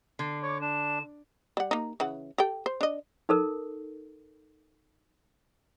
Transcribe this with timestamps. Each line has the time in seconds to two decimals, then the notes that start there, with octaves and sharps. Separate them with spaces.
0.19 D3 C7
0.43 C#5 D6
0.61 D4 E7
1.57 G3 F#5
1.71 A#3 D#4
2.00 C#3 E3 F#5
2.38 G4 A4 G5
2.66 C5
2.81 D4 D#5
3.29 D#4 A4 A#4